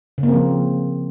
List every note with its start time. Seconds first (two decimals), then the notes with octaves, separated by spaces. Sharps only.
0.18 C#3
0.23 A#3
0.28 C4
0.33 F3